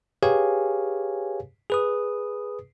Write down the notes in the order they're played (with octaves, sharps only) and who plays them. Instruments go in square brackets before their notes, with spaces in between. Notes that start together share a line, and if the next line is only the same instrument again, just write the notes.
[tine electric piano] G4 G#4 B4 C#5 F5 G#5
G#4 B4 D#6